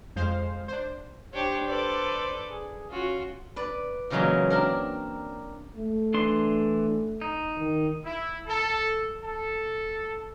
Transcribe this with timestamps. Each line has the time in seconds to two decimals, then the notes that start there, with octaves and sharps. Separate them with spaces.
0.16 F2 F3 G#3 C5 F5
0.68 D4 C5
1.34 D4 G4 C5 C#5
1.67 A4 B4 D5
2.50 G#4
2.91 C#4 F4 F#4
3.56 B4 D5
4.10 A#2 C#3 E3 F#3 G#3 A#3
4.50 C4 D4 A#4
5.76 A3
6.14 E3 D4 C6
7.21 D#4
7.57 D#3
8.05 E4
8.48 A4
9.23 A4